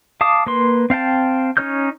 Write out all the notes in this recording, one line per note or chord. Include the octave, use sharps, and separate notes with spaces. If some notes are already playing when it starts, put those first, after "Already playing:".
F5 A5 D6 D#6
A#3 B4 C6
C4 F5 G5 A5
C#4 D#4 C#5 F6 G6